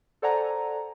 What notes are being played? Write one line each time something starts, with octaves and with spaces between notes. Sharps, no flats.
A4 C5 D5 F#5 G#5 A#5